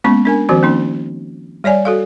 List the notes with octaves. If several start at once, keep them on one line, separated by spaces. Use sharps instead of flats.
G#3 A#3 B3 C#4 C#6
D4 A#4 G#5
D#3 F3 C4 F#4 C5
A#3 C#4 D#4
G3 C#5 D5 G#5
F#4 A4 F5